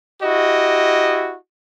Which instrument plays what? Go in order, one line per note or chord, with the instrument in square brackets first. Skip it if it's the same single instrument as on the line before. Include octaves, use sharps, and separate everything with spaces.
[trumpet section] E4 F#4 G4 D#5